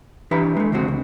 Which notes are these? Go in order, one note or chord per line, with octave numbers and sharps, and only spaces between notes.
E3 D4 G4 B4 E5 A#5
G#3 A3
C#2 D3 G#3 C4 F#4
C#2